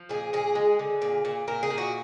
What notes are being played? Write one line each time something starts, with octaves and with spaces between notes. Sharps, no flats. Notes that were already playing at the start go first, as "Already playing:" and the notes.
Already playing: F3
A#2 G#4
A#2 G#4
G#3
D3
A#2
A#2
A#2 A#4
G#4
A#2
F#4